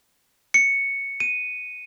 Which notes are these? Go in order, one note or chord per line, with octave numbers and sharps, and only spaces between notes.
C#7
D#7